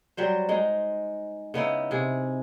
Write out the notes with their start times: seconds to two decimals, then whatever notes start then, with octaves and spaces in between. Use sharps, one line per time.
0.17 F#3 G3 C5
0.49 G#3 D#4
1.54 C#3 B3 D#4 E4
1.91 C3 G#4